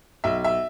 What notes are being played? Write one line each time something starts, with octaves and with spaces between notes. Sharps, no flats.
B1 E5
E5